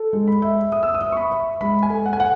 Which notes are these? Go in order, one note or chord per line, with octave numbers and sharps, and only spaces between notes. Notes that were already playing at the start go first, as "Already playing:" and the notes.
Already playing: A4
G#3
B5
E5
E5 D#6
E6
D#6
E5
C#6
B5
E5
G#3 B5
G#5
A4
F#5
G#5
F#5